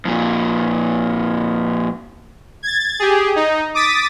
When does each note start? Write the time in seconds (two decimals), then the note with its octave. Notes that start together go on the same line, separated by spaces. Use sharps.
0.05 F2 A#2
2.63 G#6 A6
3.00 G4 G#4
3.36 D#4
3.75 D6 D#6 A6 B6